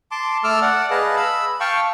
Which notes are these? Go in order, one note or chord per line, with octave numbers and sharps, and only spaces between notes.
A5 C6 D6
A3 A4 A5 D6 E6 F6
D5 F#5
G#4 B4 D#5 F5 A5
B5 E6
F5 G5 A5 C#6